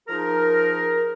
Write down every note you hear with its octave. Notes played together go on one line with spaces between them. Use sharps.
F3 D#4 G#4 A#4